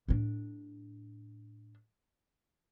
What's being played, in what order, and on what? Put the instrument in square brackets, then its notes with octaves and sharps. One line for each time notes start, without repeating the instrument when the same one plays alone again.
[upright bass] A2 D4